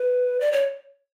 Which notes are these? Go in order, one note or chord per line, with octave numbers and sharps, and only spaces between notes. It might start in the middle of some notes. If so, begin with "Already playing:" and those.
Already playing: B4
D5
C#5